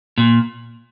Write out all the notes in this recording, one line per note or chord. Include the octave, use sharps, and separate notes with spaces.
A#2